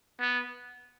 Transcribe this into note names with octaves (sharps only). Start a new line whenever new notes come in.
B3